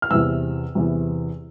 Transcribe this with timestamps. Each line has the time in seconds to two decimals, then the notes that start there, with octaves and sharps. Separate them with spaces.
0.02 F6
0.11 E2 C3 E3 E6
0.75 E2 C3 E3